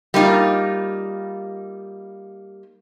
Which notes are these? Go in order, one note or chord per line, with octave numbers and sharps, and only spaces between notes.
G3 A#3 D#4 F4